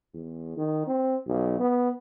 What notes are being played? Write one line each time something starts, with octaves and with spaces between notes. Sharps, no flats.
E2
D#3
C4
B1
B3